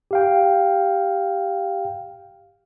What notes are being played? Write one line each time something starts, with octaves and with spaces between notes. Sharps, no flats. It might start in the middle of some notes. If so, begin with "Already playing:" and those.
G4 F5 G5